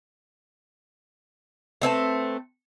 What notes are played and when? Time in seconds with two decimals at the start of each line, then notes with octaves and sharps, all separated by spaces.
1.82 A3 C4 B4 A5